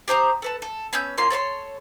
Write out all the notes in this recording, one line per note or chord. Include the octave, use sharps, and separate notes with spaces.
G4 C5 A#5 D#6
A4 B4 A5
A4
B3 C#4 E6 G6
A#3 C#4 F4 C6
A4 C#5 B5 C6